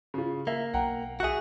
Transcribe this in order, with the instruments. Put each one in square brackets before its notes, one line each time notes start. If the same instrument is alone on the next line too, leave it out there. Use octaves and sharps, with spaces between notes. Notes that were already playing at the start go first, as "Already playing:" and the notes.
[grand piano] C#3 F4
[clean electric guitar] A#3 [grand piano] E5
[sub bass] B1 [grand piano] F#5 G5 A#5
[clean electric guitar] F#4 G#4 [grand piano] E5 F#6